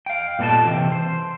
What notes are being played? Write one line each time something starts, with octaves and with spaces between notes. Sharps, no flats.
F5 G5
G2 A#2 B3 A4 D#5 A5
C3 E3 G5
C5